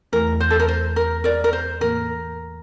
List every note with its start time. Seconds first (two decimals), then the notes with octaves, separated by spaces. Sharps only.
0.13 E2 E3 A3 A#4
0.40 C5
0.51 A4
0.60 A#4
0.68 C5
0.96 A#4
1.24 A#4 D5
1.44 A#4
1.53 C5
1.81 A2 E3 A#3 A#4